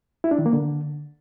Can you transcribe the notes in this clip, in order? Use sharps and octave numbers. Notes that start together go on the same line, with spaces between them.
E4
D4
D#3
A#3
D3